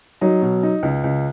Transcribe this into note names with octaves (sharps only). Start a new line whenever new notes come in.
F#3 D#4
B2
D#4
C#2
C#2